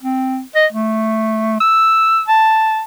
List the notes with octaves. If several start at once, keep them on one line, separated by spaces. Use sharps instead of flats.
C4
D#5
A3
E6
A5